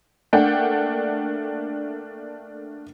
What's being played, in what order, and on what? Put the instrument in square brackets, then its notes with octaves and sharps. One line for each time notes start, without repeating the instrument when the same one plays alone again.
[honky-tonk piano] A3 A#3 D4 F#5 G5